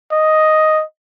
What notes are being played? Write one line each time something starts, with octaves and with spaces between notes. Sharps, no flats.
D#5